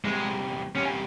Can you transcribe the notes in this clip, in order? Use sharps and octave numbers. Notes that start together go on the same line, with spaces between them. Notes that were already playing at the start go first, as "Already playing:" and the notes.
E2 C3 G3 G#3 A#3
E2 C3 G3 A#3 C#4